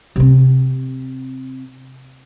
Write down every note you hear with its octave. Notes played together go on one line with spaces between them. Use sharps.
C3 C4